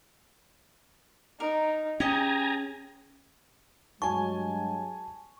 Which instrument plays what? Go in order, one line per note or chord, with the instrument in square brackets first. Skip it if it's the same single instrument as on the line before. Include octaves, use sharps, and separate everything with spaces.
[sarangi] D#4 [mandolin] A#4
[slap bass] C#4 [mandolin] G4 D#5 [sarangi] G#4 [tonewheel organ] G#5 A#5
[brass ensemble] G2 F#3 G#3 [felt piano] G#5 A5 [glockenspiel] C#6